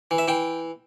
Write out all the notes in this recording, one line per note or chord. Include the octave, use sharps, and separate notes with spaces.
E3
E5
E3 G5